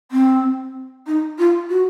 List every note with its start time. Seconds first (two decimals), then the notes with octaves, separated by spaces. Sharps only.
0.12 C4
1.07 D#4
1.38 F4
1.70 F#4